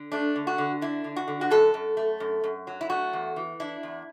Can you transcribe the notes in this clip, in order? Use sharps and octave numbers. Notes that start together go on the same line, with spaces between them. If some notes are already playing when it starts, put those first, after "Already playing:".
Already playing: D3
A3 D4
D3
F#4
D3
D4 E4
D3
F#4
D3
F#4
F#2 A4
F#2
A3
F#2
F#2
F#3
E4
A3 F#4
E2
E3
D4 E4
E2